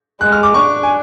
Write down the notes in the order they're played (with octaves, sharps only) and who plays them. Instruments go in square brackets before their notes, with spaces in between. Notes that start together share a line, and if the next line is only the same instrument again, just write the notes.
[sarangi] G#3 [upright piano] F#6
[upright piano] F6
D6
[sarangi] D4 [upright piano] C#6
[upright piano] G#5